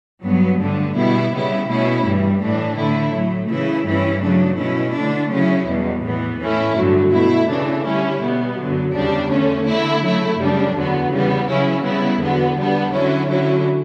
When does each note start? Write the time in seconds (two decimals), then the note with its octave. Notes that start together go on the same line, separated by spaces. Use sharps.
0.25 G2 F#3 B3
0.61 G2 D3 A3 D4
0.96 B2 G3 B3 E4
1.33 C#3 G3 B3 E4
1.69 B2 A3 C#4 E4
2.05 G2 E3 G3
2.42 A2 E3 A3 D4
2.78 D3 A3 E4
3.14 A2 F#3 A3
3.50 C#3 E3 A3 E4
3.87 G2 E3 G3 C#4 E4
4.23 C#3 F#3 A3 D4
4.59 B2 A3 C#4 E4
4.95 D3 A3 D4
5.32 C#3 F#3 C#4 E4
5.68 E2 B2 G3
6.04 A2 E3 B3
6.41 A2 E3 A3 C#4 E4
6.77 G2 D3 F#3 A3
7.13 B2 A3 E4
7.49 C#3 E3 A3 D4
7.86 D3 G3 C#4 E4
8.22 B2 G3 B3
8.58 F#2 D3 F#3
8.94 E2 C#3 G3 D4
9.30 D3 A3 C#4
9.67 E2 D3 A3 E4
10.03 C#3 F#3 A3 E4
10.39 F#2 C#3 G3 D4
10.75 E2 D3 F#3 B3
11.11 C#3 E3 G3 B3
11.48 C#3 F#3 C#4 E4
11.84 C#3 G3 B3 E4
12.21 E2 D3 F#3 B3
12.57 D3 G3 B3 D4
12.93 D3 F#3 C#4 E4
13.29 D3 F#3 C#4 E4